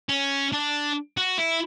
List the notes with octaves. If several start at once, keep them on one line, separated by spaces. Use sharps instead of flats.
C#4
D4
F#4
E4